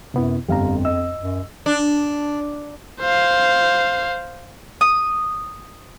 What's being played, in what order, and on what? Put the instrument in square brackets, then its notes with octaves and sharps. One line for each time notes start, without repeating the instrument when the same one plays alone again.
[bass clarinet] F#2 [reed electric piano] C3 B3 E4
[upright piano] G1 [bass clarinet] F2 [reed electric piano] G4 F5 A#5
[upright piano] D#5 [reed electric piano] E6
[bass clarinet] F#2
[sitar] D4
[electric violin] C5 F5
[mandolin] D#6